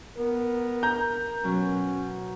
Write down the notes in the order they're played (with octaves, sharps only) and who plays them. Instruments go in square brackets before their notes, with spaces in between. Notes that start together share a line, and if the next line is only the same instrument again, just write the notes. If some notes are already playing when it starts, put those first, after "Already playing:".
[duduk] B3 [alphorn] A#4
[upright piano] A#5 G6
[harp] B2 F#3 [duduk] C#4